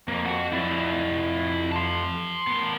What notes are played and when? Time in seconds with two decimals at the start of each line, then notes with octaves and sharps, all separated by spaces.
0.08 F2 A#3
0.25 F#4 F#5
0.53 F2 E4 D5 E5
1.72 A5 C6
2.47 B3 A#4